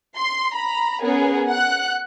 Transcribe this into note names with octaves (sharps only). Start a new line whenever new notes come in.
C6
A#5 B5
B3 C#4 G#4 A#4
F#5 F#6